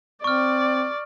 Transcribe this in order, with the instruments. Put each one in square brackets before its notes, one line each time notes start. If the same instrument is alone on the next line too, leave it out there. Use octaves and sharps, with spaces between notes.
[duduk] C4 [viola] D5 [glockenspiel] C#6 F6